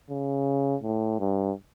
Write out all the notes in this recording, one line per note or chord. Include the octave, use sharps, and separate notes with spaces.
C#3
A2
G2